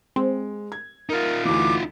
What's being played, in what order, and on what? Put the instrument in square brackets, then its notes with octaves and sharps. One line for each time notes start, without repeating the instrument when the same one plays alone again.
[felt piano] G#3 [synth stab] C4
[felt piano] G#6
[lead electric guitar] D#4 F4 [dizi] A#4
[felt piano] D2 E3 [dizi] D6